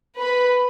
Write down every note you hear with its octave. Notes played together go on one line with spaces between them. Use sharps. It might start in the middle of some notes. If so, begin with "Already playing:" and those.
B4 B5